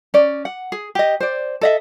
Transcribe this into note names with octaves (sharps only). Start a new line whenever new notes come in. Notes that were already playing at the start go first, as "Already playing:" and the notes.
C#4 D5
F#5
G#4
G4 D#5
C5 D5
A4 D#5 E5